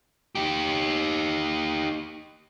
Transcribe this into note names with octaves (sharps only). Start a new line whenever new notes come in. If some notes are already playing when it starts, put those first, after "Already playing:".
D#4 G4